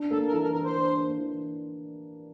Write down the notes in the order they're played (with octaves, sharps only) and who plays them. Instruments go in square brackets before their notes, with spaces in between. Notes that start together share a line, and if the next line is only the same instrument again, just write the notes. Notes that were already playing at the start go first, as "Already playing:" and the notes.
Already playing: [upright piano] D4
[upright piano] A#3 [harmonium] A4
[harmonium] A#4
[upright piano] E3 [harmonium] A4
[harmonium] A#4
[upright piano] E3 [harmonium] A#4
[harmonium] C5
[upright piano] D4
A#3
E3